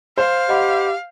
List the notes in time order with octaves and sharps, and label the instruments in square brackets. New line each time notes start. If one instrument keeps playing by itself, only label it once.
[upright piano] C5 [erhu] F5
[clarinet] G4 [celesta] D#5 F#5 B5